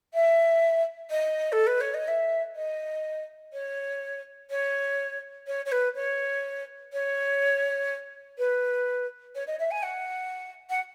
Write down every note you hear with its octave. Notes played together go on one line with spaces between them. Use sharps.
E5
D#5
A4
B4
C#5
D#5
E5
D#5
C#5
C#5
C#5
C#5
B4
C#5
C#5
B4
C#5
D#5
E5
G#5
F#5
F#5